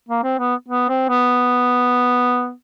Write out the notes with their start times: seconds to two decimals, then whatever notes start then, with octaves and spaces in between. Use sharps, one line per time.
0.08 A#3
0.23 C4
0.38 B3
0.68 B3
0.89 C4
1.08 B3